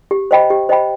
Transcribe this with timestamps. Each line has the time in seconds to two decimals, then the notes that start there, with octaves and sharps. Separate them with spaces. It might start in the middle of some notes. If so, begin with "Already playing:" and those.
0.11 G4
0.31 C5 D#5 G5 B5
0.50 G4
0.69 C5 D#5 G5 B5